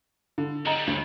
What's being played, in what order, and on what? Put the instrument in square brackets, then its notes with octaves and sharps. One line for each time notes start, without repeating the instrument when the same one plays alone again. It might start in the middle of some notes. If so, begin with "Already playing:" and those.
[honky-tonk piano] D3
[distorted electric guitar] F#3 G3 [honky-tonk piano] D#5 A#5
[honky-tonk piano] D2